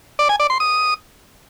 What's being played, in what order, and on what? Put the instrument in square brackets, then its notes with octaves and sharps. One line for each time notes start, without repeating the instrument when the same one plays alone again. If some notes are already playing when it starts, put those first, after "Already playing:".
[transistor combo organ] D5
G#5
D5
C6
D#6